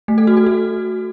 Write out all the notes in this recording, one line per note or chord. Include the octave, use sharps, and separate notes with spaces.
A3
A4
F#4
A4
F#4